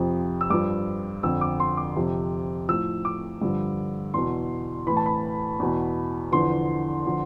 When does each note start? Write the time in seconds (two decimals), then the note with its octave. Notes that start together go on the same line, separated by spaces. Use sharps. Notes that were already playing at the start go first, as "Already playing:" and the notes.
Already playing: F2 C3 F3
0.41 E6
0.50 G2 F3 D6
1.23 F2 D3 F3 E6
1.41 D6
1.60 C6
1.77 D6
1.96 F2 C3 F3
2.69 A2 F3 E6
3.05 D6
3.42 G2 D3 F3
4.14 E2 B2 C6
4.87 A2 E3 B5
4.97 A5
5.06 B5
5.60 E2 B2
6.32 E2 D3 F3 C6
7.07 D3 F3